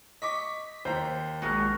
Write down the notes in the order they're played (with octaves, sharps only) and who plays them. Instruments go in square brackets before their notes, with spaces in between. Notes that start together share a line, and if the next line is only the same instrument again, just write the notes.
[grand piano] D#5 C#6 D6 [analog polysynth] B6
[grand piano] D#2 A#5 [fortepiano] C5
[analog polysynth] A#1 G#3 [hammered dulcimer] F#4 A#4